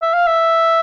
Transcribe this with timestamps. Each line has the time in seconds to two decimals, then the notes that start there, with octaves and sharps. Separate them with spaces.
0.02 E5
0.14 F5
0.27 E5